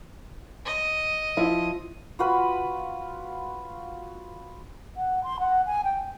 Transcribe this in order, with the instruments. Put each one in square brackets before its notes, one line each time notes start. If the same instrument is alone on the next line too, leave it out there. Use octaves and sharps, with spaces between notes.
[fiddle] D#5
[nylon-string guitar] F3 E4 E5
[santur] F4 F#4 B4 B5
[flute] F#5
C6
F#5
G#5
G5